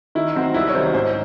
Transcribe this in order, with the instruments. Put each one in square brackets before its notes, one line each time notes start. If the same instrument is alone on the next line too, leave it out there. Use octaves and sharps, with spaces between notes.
[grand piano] D#3 [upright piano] E4
[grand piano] F#3 C4 F#4 C5
[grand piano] C2 [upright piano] E4
[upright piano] C#5
[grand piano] C3 D#3 F#3 C#4 [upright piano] C5
[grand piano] G#2 [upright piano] C5